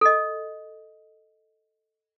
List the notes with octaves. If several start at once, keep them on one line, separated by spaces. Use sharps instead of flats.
A4 D#5